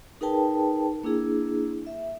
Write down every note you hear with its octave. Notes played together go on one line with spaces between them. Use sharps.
D#4 G#4 A#4 B4 G5 A5
A#3 D4 E4 G#4
E5